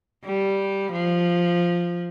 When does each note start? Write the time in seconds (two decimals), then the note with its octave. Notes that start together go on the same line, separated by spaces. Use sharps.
0.24 G3
0.92 F3